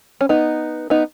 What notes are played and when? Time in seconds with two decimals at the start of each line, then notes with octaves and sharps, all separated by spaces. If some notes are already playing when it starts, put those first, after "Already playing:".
0.21 C#4
0.29 B3 D#4
0.90 B3 D#4